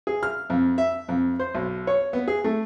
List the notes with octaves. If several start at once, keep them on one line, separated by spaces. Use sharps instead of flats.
G#4
F6
F2
E5
F2
C5
B1
C#5
B3
G#4
A3